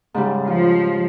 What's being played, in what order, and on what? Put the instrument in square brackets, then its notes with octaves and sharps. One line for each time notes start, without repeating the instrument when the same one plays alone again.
[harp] G#2 C#3 G3
[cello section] F3 [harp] F4